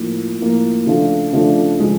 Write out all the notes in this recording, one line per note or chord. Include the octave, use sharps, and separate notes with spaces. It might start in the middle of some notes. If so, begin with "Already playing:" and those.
Already playing: A2 F3 A#3
A2 F3 A#3
C#3 F3 A3 D4 F4
C#3 F3 A3 D4 F4
C#3 F3 G#3